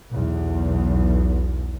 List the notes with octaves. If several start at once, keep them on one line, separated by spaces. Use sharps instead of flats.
B1 E2